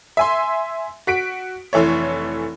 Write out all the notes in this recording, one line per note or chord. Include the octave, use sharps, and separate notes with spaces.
E5 G#5 C6
F#4 B6 D7
F1 E3 A3 C#5